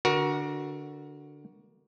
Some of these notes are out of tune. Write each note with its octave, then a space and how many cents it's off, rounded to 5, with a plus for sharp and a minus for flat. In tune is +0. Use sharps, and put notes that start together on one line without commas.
D3 +0 F#4 +0 A#4 +30